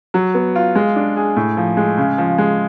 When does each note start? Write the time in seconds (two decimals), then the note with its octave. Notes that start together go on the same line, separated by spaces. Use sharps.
0.14 F#3
0.34 B3
0.55 F4
0.75 G#3
0.96 D4
1.16 G#4
1.36 A2
1.57 F3
1.77 G#3
1.98 C#3
2.18 F3
2.38 G#3